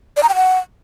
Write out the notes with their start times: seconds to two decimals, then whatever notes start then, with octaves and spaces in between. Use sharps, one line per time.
0.17 D5
0.23 A#5
0.29 G5
0.35 F#5